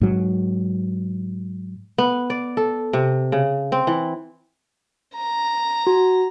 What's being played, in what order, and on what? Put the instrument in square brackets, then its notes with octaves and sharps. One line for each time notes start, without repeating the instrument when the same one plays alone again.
[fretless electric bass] G#2 F#3
[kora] B3
D5
A4
C3
C#3
C4
E3
[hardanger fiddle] A#5
[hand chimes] F#4